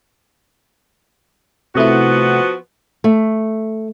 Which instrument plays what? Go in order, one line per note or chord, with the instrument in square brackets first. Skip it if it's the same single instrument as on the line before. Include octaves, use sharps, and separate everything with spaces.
[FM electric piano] C3 A3 E4 [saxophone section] F3 B3 F#4
[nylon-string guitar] A3